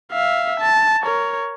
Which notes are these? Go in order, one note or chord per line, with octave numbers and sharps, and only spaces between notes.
E5 F5
A5
A#4 C#5